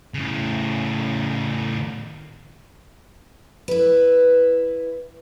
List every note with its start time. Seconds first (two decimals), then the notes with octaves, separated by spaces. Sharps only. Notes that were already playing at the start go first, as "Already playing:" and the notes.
0.14 A2 C#3
3.68 E4 B4